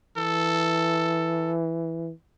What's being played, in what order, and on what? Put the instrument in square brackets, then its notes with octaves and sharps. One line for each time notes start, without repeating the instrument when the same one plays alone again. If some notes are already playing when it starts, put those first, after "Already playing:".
[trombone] E3 [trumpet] A4